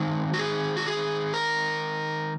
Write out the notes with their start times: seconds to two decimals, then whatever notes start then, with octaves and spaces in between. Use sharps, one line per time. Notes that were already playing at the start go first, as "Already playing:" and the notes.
Already playing: D#3 G#3 C4 D#4 F#4
0.34 F#4
0.39 G#4
0.77 F#4
0.87 G#4
1.34 A#4